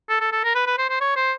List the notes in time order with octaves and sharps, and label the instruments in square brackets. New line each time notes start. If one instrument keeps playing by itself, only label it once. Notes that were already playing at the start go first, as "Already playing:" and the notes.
[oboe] A4
A4
A4
A#4
B4
B4
C5
C5
C#5
C5